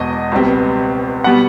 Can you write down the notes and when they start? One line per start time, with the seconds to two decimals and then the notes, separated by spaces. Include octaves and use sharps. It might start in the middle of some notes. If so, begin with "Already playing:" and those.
Already playing: E1 E2 B2 D#5
0.32 C#2 B2 G3 C4
1.24 B2 G3 B3 F#5